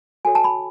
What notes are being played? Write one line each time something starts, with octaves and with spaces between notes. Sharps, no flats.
F#4 A4 C#5 G#5
A5
B5